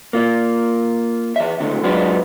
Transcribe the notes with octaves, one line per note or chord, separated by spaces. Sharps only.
A#3 F4
E2 E5
C#2 A2 D3
F#3 G#3 D4 F4 B4